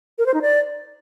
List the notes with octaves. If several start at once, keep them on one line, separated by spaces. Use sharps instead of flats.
A#4
C5
D#4
D5